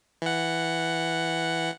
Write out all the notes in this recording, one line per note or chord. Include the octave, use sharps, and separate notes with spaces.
E3 F#5